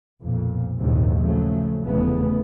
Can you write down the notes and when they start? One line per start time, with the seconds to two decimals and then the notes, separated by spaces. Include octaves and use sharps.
0.22 B1 F2 A#2
0.78 A#1 D#2 G#2 C3 D#3 F#3
1.19 C#3 F3 F#3 A3
1.82 F1 E2 C#3 A3 B3